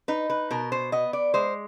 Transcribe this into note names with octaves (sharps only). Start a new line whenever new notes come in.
D#4 B4
B4
B2 A#4
C5
B3 D#5
D5
G#3 C5